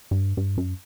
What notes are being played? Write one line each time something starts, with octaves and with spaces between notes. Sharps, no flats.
G2
G2
F#2